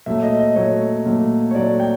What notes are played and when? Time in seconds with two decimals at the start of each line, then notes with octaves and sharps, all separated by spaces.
0.06 A#2 F#3 A3 E5
0.23 D#5
0.39 D#5
0.56 A#2 F#3 A3 C#5
1.06 A#2 F#3 A3
1.51 C#5
1.55 A#2 F#3 A3 D5
1.80 G5